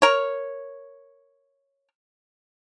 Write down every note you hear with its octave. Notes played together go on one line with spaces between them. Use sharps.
A#4 C#5